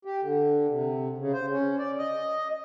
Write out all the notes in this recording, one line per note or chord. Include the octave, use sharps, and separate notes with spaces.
G4
D3
C3
C#3
C5
C#4
D5
D#5